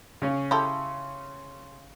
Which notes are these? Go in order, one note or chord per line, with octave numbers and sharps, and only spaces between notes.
C#3 C#4
E4 G4 A4 C6